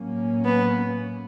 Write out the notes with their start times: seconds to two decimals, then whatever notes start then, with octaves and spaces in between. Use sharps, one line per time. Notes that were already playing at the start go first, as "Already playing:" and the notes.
Already playing: A2 F#3 A#3 C#4
0.45 B3